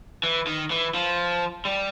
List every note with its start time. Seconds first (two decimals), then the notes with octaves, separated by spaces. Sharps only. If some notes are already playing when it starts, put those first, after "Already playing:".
0.23 E3
0.47 D#3
0.70 E3
0.94 F3
1.65 G3